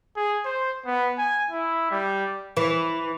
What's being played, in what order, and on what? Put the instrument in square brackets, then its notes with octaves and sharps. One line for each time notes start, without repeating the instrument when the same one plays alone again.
[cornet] G#4
C5
B3
G#5
E4
G3
[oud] E3